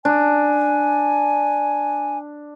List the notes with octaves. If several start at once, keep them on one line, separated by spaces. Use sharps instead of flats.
D4 G#5